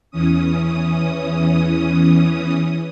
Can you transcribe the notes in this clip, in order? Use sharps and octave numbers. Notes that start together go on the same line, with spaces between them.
E2 E3 C#4 D#6